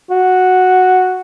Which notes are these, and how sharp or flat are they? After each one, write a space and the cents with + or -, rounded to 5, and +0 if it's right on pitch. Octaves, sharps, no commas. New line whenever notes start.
F#4 -5